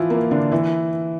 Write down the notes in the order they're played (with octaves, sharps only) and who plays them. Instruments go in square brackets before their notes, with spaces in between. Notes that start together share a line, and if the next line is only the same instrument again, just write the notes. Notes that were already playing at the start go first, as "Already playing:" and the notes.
Already playing: [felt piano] E3 F3 E4 F4
A#3
D3 D4
E3 E4